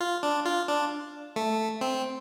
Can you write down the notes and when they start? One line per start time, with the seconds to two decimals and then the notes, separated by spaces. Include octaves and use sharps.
0.01 F4
0.23 D4
0.45 F4
0.68 D4
1.36 A3
1.81 C4